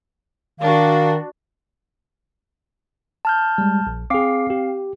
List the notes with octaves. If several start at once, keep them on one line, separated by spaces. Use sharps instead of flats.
D#3 D4 F#4 F5
A5 F6 G6
G3 G#3
A#1
C4 G#4 F5 D6 C7
G4